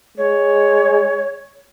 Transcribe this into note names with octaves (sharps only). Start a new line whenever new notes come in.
G#3 C#5